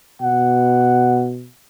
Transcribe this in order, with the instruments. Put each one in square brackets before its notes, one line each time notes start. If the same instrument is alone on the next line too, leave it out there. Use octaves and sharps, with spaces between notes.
[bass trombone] B2 [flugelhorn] F#5